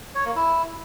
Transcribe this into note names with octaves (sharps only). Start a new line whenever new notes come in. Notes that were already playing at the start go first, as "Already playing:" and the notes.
C#5
A#3
E4